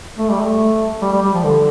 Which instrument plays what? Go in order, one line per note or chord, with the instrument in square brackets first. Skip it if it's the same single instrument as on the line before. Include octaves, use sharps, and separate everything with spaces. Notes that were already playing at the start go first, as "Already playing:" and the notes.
[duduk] A3
G3
A3
G3
G3
G3
F3
D3